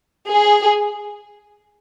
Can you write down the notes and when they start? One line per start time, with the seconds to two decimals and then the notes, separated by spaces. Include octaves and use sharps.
0.28 G#4